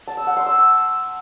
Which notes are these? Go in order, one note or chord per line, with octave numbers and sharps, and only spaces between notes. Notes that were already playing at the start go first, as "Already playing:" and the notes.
A5
E6
F#5
C6
E6